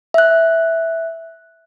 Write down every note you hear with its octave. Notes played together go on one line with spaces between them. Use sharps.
E5 F#6